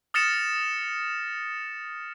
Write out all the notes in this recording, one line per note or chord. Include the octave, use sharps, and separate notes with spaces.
D#6 F6 A6 A#6 C#7 E7